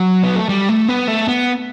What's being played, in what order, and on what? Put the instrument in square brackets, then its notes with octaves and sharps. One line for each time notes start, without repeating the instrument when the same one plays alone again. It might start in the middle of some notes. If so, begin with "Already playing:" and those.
Already playing: [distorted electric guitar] F#3
B3
A3
G3
A3
B3
A3
B3